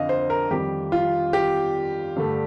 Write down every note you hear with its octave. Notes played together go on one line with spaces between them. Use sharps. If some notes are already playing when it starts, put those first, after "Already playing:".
Already playing: F2 D3 D#5 F5
C5
A#4
F2 D#3 G3 G4
F4
G4
G2 D3 A3